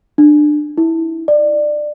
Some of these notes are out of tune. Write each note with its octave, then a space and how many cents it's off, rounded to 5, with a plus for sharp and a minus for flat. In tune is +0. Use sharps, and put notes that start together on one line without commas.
D4 +25
E4 -15
D5 +20